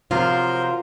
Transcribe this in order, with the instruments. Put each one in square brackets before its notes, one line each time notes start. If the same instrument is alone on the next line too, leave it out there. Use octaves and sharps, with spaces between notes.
[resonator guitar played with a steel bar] C3 F3 F#3 [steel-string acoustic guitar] F4 [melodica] A#4 C5